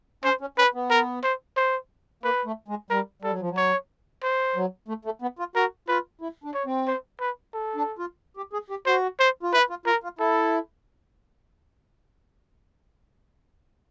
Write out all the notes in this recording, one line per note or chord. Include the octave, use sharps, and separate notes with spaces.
C#4 C5
C#4
C#4 B4
B3
A#4
C5
C5
A#3 B4
A3
G#3
G3 A#4
G3 A4
F#3
F3
F#3
C#5
C5
F#3
A3
A3
B3
F4
F#4 A#4
F4 B4
E4
D4
C#5
C4
C5
B4
A4
D4
F4
G4
G#4
G4
F#4 C5
C5
F4
E4 B4
F4
F4 A#4
F4
E4 A4